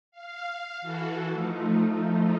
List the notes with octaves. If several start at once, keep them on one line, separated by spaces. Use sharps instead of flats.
F5
E3 F#4 A4
F3 A3 D#4